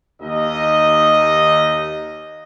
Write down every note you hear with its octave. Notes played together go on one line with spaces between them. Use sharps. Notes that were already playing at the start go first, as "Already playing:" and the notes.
D#2 D#4 D#5